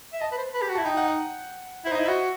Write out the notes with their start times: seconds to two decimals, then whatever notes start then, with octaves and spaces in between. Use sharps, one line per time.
0.13 E5
0.21 D#5 A5
0.32 B4
0.37 C5
0.54 B4
0.62 G4
0.70 F#4
0.75 E4 A5
0.85 D#4 G5
0.97 F#5
1.08 F#5
1.85 E4 C5
1.92 D#4
1.95 E4 D#5
2.06 F#4 E5